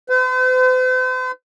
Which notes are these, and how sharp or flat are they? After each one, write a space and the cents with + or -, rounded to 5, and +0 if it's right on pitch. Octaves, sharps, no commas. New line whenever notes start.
C5 -45